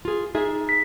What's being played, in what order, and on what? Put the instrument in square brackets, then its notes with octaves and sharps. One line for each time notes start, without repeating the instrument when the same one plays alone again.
[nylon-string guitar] F4 G#4
[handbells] D#4 [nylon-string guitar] G#4 E5
[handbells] B6